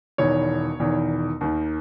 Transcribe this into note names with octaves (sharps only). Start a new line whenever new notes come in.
E1 E2 D#3 C#5
E1 E2 D#3
D#2 D#3